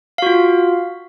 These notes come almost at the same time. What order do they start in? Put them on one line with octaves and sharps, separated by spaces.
F5 F#4 F4